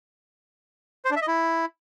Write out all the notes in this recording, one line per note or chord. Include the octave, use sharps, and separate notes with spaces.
C5
D4
E5
D#5
E4